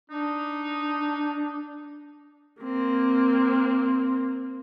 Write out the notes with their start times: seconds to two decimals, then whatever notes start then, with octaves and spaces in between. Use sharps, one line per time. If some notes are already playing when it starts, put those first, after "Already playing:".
0.10 D4 D#4
2.62 A#3 C4